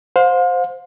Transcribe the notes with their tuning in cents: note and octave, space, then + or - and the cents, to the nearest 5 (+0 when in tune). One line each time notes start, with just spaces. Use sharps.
C5 +0 F5 +40